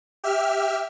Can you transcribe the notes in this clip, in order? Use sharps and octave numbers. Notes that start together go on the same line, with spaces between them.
G4 E5 F6